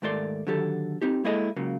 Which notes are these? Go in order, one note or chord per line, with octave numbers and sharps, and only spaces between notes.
D#2 G#2 A3 A#4 D5 C6
D3 D#3 F#3 G4 A4
C4 D#4 G4
G#3 A#3 E4 G#4 A4 D#5
C#2 C#3 F#3 A#3